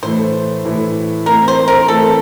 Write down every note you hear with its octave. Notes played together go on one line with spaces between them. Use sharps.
A2 E3 A3 C5
A2 E3 A3
E3 A3 C4 A#4
C5
A#4
E3 A3 C4 A4